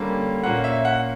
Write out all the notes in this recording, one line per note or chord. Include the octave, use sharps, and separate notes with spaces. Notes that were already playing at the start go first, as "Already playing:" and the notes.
Already playing: D3 G3 A#3 C#4
A#2 A#3 C#4 F#5
E5
F#5